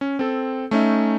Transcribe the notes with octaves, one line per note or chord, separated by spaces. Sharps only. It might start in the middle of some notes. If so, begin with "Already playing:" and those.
C#4
C4 A4
A3 C#4 D#4 E5